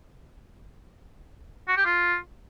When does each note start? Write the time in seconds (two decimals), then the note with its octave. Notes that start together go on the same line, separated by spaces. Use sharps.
1.68 F#4
1.77 G4
1.85 F4